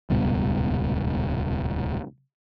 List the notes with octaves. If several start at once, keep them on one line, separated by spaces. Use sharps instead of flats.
D#1 C#2 G2 B2